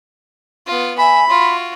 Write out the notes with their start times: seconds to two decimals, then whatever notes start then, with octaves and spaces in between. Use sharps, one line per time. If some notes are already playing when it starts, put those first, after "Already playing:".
0.67 B3 F4
0.98 E5 G#5 B5
1.29 F4 F#4 C6